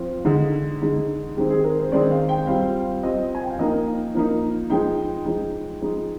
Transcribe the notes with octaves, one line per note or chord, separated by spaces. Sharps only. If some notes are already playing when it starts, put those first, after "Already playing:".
Already playing: F3 C4 F4
D3 G#3 D#4
D3 G#3 D#4
D#3 G#3 C4 D#4 G4
G#4
A#4
C5
D#3 G#3 C4 D#4 D5
F5
G5
G3 C4 F4 F5
G3 C4 F4 D#5
G#5
G5
F5
F3 A#3 D#4 D#5
F3 A#3 D#4
F3 G#3 D#4 G5
F3 G#3 D#4
F3 G#3 D#4